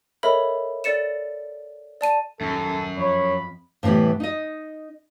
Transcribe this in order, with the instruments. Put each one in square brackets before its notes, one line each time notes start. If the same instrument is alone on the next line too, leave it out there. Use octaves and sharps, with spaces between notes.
[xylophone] A4 A#4 C#5 D#5 E5 B5
A4 D5 A6 C#7 E7
D5 A5 D#7
[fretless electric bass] D#1 [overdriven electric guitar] F#2 [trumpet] A4
[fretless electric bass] F2 [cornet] C#5 [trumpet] B5
[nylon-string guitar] A2 C3 E3 G3 B3
D#4 D#5